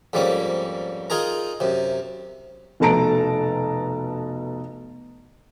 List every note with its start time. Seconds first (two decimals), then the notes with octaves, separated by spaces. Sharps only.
0.13 F2 G#2 G3 A#3 C#4
1.10 D#4 F4 G#4 A#4 A#5
1.60 F#2 C3
2.80 F1 B2 A4 A5 A#5 D7